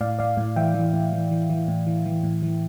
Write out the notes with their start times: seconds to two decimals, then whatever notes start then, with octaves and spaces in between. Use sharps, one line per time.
0.01 A2 D5 F5
0.19 A2 D5 F5
0.37 A2
0.56 E3 E5 G5
0.74 E3
0.94 A2
1.13 E3
1.31 E3
1.50 E3
1.68 A2
1.87 E3
2.06 E3
2.24 A2
2.43 E3